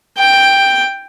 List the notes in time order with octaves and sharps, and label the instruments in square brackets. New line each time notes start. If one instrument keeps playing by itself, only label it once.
[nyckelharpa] G5